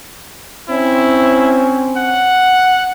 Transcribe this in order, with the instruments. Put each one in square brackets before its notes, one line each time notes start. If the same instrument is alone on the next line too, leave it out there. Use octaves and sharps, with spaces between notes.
[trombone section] C4 C#4 [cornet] E4
[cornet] F#5